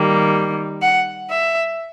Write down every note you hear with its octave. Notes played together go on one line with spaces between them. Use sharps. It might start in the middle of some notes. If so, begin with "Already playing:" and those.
Already playing: D#3 G3 A#3
F#5
E5